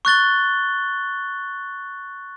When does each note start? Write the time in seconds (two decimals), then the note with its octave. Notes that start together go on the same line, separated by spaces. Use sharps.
0.05 C#6 F#6 A6 G7